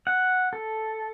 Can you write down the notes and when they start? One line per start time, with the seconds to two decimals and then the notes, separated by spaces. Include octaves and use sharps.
0.07 F#5
0.53 A4